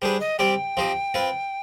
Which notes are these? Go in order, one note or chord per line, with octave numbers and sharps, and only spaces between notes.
G3 D4 G#4 B4 C5
D#5
G3 C4 G4 D5 G5
F3 C4 G4 C5 D#5
C4 F4 B4